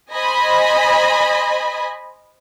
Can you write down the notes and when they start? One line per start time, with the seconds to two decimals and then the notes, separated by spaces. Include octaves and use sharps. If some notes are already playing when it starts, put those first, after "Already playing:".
0.13 C5 D#5 G#5 B5